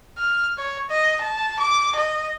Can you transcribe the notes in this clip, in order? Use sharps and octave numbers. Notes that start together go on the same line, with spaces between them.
F6
C#5
D#5
A5
D6
D#5